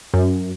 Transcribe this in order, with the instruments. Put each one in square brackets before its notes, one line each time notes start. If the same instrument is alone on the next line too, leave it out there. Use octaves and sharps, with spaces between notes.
[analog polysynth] F#2